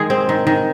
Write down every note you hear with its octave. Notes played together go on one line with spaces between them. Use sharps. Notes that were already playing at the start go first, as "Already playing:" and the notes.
Already playing: D#3 G#3 G#4
C4
D#3
D#3